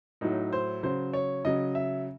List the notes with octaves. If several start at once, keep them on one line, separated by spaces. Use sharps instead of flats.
A2 F#3 D#4
C5
C#3 F#3 C5
C#5
C#3 F#3 D#5
E5